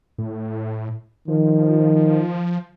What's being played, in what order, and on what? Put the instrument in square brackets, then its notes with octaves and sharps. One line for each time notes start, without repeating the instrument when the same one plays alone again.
[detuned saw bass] A2
[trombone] D#3 [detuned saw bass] F3